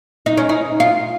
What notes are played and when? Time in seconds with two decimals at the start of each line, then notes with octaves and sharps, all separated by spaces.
0.26 D#4
0.37 C#4
0.49 D#4
0.80 F4